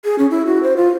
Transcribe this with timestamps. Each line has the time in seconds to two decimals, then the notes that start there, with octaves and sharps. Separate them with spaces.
0.05 G#4
0.19 C#4
0.31 E4
0.46 F#4
0.63 C5
0.76 F4